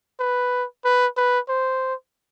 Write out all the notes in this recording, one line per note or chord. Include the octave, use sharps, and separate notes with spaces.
B4
B4
B4
C5